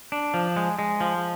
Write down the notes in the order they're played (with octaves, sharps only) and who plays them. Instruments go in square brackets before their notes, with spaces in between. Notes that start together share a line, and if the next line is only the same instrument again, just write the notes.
[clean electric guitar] D4
F3
G#3
G#3
F3